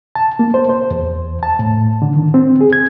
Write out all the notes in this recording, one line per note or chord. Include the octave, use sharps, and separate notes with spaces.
A5
A#3
C5
C5
E2
A5
A2
D3
D#3
C4
G#4
G#6